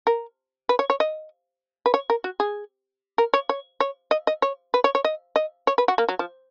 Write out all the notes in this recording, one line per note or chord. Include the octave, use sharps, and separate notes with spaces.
A#4
B4
C#5
C#5
D#5
B4
C#5
A#4
F#4
G#4
A#4
C#5
C#5
C#5
D#5
D#5
C#5
B4
C#5
C#5
D#5
D#5
C#5
B4
F#4
A#3
F#3
F3